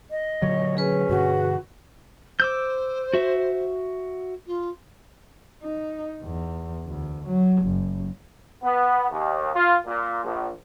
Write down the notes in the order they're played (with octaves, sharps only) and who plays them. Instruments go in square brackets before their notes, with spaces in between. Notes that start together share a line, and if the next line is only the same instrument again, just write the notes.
[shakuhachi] D#5
[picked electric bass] A#2 D3 F#3 [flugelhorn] C#5
[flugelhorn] C#4 [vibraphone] G#4 B4 C#5
[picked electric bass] G2 B2 D3 [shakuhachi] F#4
[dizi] C5 [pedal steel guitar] D6 E6 G6
[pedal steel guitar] F#4 E5
[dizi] F4
[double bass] D#4
E2
D2
F#3
F#1
[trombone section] B3
D#2
F4
A#2
A#1